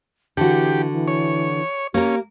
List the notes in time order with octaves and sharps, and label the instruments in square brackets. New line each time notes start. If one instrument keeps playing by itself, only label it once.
[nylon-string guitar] D3 F#4 [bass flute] E3 [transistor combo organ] G4
[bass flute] E3
[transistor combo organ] C#5
[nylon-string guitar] A#3 A#4 [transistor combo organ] C#4 [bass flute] G4